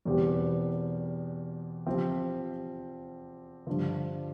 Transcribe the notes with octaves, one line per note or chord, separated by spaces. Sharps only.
E2 B2 G3 C4 G4
F3 C4 G4
G2 D3 F3